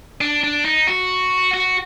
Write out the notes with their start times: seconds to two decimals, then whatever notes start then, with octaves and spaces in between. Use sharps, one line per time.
0.21 D4
0.44 D4
0.65 D#4
0.87 F#4
1.54 F#4